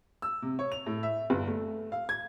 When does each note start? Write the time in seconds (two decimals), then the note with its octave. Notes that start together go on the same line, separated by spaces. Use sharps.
0.22 E6
0.42 C3
0.59 C#5
0.72 F7
0.86 A2
1.03 E5
1.30 G1
1.48 A3
1.92 F5
2.09 G#6